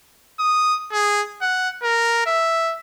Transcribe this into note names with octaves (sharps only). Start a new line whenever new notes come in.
D#6
G#4
F#5
A#4
E5